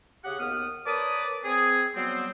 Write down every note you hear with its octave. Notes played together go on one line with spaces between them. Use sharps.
C#3 G4 G#4 F#5
D#2 B3 D#6 F6
A#4 B4 C#5 D5 A5 D#6
C4 G#4
F#3 G3 B3 C4